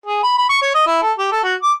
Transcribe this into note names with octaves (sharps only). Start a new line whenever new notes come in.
G#4
B5
B5
C#6
C#5
D#5
E4
A4
G4
A4
F#4
D6